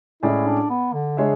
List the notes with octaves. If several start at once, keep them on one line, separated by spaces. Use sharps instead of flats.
A2 G#3 C#4 E4 G#4 D5
D4
B3
D3
C#3 G#3 D4 G#4 C#5 E5